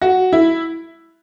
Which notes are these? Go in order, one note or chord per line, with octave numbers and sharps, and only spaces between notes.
F#4
E4